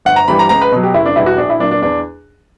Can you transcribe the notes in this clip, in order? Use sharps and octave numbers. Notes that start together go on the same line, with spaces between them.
G1 F#5
A#5
G2 E3 G3 B5
A#5
C#2 A#5
B4
B2 F#3
G4
F#1 E4
D4
E2 B2 G3 E4
F#4
A#1 D4
E4
A#2 F#3 D4
D4
E2 D4